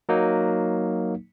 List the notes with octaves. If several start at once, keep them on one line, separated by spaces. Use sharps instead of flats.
F#3 A#3 D#4